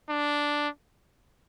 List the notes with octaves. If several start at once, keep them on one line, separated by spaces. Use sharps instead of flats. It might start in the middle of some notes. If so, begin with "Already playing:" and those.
D4